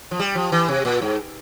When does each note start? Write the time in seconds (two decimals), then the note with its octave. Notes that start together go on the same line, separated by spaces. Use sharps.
0.11 F3
0.19 G3
0.35 F3
0.52 E3
0.68 C3
0.85 A#2
1.02 G#2